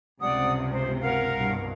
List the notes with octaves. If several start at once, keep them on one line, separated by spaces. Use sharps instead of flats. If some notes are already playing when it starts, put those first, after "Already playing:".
C#2 G2 C3 D5 F#5 D#6
C5
A#4 F5 F#5
C2 G2 B2